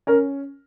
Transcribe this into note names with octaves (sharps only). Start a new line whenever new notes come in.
C#4 A#4